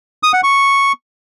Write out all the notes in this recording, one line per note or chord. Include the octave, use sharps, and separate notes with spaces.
D#6
F#5
C#6